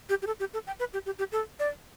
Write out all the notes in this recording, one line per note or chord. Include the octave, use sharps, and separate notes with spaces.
G4
G4
A4
G4
A4
G5
B4
G4
G4
G4
A4
D5